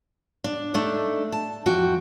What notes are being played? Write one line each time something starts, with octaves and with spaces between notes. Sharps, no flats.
D4
A3 D4 D#4
A5
F2 E3 F#4 G5